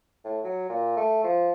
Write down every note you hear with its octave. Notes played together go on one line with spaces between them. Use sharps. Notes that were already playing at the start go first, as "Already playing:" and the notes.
A2
F#3
A#2
A3
F3